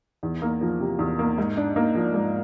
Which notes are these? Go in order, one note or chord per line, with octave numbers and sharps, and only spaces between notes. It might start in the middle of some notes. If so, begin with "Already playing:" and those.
E2
A#3
F3
C3
E2
A#3
G#2
D4
A#3
F3
G#2